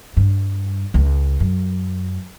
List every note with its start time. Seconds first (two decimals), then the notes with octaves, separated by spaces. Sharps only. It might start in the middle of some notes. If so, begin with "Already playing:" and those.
0.17 G2
0.94 C#2
1.40 F#2